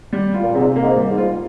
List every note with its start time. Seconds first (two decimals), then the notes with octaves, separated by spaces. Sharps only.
0.13 G3
0.34 F4
0.44 A#2
0.55 G#2 C3
0.76 A#3
0.82 G#2
0.97 G3
1.11 G#2
1.18 F4